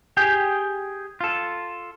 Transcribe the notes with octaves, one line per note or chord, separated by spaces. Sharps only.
G4 G#4 G5
F4 A4